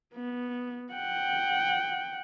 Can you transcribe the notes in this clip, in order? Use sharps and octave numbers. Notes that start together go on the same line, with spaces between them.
B3
F#5 G5